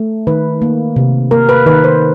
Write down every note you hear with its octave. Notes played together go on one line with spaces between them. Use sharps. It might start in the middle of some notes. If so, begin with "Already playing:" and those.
Already playing: A3
D#3 B4
A#3
C3
A#3 A#4
B4
D#3 B4
C5